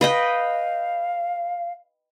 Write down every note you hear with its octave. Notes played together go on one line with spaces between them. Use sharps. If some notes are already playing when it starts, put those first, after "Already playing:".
B4 D#5 F5 G5